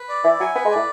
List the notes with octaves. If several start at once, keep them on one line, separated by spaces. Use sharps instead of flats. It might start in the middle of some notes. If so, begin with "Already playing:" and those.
Already playing: B4
D5
E3 E4
F#3 G#5
B3 B4
G#3
A2 D5